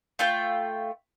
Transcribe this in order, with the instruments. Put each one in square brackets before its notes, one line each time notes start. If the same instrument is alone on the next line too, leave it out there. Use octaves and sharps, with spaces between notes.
[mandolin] A3 F4 G5